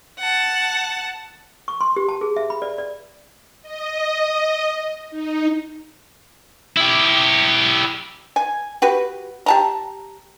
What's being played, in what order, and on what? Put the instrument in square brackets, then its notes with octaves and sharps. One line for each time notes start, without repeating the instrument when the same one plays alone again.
[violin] F#5 A5
[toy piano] C#6
C6
G4
A5
G#4
E5
B5
D5
D5
[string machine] D#5
D#4
[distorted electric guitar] E4 G4
[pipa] G#5
F#4 G4 B4
G4 A5 A#5